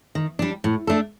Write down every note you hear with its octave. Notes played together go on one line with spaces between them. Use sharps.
D#3
G3 D4
A2
A3 D4 A4